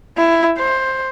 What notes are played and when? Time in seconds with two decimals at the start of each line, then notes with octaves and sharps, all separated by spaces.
0.18 E4
0.58 C5